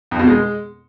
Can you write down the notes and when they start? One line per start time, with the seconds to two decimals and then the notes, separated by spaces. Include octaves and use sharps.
0.11 F2
0.19 B2
0.27 G#3